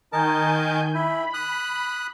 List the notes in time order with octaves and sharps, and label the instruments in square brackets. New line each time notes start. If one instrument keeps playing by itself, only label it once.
[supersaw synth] D#3 G#5 G6 [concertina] D#4 A#4 A5
[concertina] E4 [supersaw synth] B5
[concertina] D#6 F#6